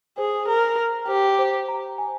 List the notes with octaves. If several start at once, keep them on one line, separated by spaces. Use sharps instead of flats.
G#4 C5
A#4 A#5
A#5
G4 C5
C5
A#5
G#5